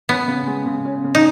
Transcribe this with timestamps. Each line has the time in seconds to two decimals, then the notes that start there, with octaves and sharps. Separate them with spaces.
0.09 B3 C#4
0.28 C#3
0.47 G#3
0.66 C#3
0.85 C#4
1.04 C#3
1.15 D#4